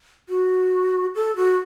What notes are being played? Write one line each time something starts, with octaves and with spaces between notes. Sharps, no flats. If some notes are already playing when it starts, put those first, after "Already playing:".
F#4
A4
F#4